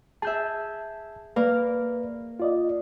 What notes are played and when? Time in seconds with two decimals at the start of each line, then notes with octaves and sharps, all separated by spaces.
0.22 G#4 E5 A5 G6
1.36 A#3 A#4 B4 D5 F5
2.40 F4 D5 D#5